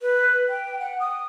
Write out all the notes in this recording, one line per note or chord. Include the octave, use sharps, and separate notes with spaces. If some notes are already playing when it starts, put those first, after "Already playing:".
B4
G5
F#5
D#6